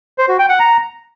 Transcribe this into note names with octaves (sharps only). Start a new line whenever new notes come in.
C5
F#4
G5
F#5
A#5